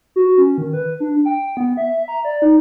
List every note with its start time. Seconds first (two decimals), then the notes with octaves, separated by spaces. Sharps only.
0.16 F#4
0.38 C#4
0.58 D#3
0.73 B4
1.00 D4
1.25 G5
1.57 B3
1.77 E5
2.08 A#5
2.25 D5
2.42 D#4